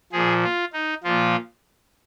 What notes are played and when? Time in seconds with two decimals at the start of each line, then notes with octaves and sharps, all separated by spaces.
0.12 A#2 F3 G#4
0.43 F4
0.73 D#4
1.03 A#2 F3 F4